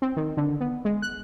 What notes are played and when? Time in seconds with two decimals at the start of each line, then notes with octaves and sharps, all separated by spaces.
0.02 C4
0.17 D#3
0.37 D3
0.60 B3
0.85 G#3
1.02 F#6